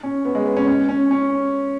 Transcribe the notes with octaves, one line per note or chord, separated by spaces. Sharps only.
C#4
B3
G#3
B3
C#4
C#4
C#4
C#4